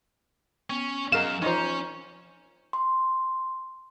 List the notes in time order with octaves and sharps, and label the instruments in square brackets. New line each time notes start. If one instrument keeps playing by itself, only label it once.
[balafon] B3 [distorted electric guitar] C#4
[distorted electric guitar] F#2 [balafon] G#4 D#5 F#5 [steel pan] A#4 F5 [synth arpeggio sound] E7
[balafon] E3 F3 F4 [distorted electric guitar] C#4 [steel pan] D#4 C5
[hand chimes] C6